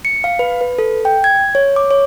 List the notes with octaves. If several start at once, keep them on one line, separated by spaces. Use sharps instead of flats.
C#7
F5
B4
B4
A4
G5
G#6
C#5
D6
C#5